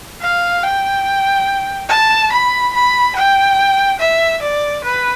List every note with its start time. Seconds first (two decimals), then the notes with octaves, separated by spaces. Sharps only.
0.21 F5
0.63 G5
1.89 A5
2.32 B5
2.73 B5
3.16 G5
4.00 E5
4.42 D5
4.84 B4